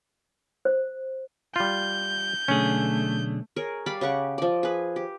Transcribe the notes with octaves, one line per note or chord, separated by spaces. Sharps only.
C5
G3 F4 G6
B1 D3 A3 C#4 G#4
G#4 A#4 C#5
G3 D5 F5 B5
C#3 G4 F#5 C#6
F3 D5
G#4 B4
G4